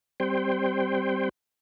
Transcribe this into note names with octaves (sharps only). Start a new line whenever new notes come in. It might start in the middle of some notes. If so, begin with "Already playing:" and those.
G3 C4 C5 G5